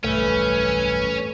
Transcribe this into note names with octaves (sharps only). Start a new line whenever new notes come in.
D1 B1 G2 E3 A3 C#4